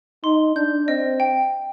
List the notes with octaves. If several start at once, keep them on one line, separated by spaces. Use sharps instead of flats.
D#4 C6
D4 G6
C4 D#5
G5